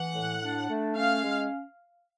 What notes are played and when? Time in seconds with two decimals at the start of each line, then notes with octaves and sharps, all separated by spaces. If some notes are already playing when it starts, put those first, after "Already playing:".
Already playing: E3 F#5
0.14 A2
0.42 D4
0.69 A3
0.96 C#4 F5
1.23 G#3